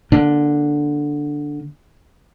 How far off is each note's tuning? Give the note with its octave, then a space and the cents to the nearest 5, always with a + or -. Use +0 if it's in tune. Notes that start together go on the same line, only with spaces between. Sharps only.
D3 +0 A#3 +35